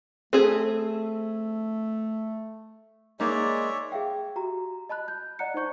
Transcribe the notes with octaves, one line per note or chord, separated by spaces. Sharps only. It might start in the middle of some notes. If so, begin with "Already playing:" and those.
A3 C4 G#4 A4
G#3 A#3 D#4 G#4 C#5 D5 E5
G#4 E5 F5 G5
F#4 G4 A#5
D#5 A5 B5 F#6
G6
D5 D#5 F#5 A#5 F#6 C#7
D#4 C5 D5 C#6 G6